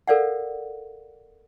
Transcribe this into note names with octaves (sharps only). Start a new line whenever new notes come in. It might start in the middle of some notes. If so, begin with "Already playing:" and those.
A4 A#4 C5 D5 F5 F#5